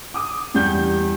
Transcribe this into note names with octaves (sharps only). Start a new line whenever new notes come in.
D6 D#6
E2 G3 G6